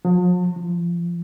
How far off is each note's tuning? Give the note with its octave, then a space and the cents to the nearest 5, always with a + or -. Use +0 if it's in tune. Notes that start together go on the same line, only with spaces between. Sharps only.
F3 +45
F3 -25